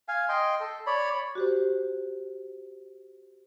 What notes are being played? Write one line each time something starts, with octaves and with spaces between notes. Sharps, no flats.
F5 G#5
D#5 G5 C6
A4
C#5 D5 B5
F#4 G4 C5